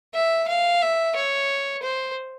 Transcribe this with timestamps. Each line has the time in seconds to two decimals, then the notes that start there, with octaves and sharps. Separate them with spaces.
0.14 E5
0.48 F5
0.82 E5
1.16 C#5
1.83 C5